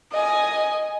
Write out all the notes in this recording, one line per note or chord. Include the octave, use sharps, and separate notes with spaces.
D#5 G#5